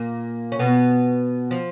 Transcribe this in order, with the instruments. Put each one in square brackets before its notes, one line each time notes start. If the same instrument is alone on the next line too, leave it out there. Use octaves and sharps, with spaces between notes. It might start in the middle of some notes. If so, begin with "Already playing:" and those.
Already playing: [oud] A#2 A#3
C#4
B2 B3
F3